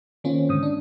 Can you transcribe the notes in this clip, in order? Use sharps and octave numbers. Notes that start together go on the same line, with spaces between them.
D#3 A#3 C4 C#4 F4
G#2 D3 D#6
D4